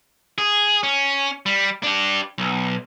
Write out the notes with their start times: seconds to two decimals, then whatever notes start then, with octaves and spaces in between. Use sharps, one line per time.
0.38 G#4
0.83 C#4
1.46 G3
1.83 D4 G4
2.38 B1